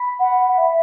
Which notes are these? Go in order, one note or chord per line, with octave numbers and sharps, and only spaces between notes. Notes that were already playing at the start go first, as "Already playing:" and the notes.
Already playing: B5
F#5
E5